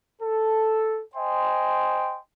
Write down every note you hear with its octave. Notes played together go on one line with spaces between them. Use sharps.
A4
C5 D#5 G5 G#5 C6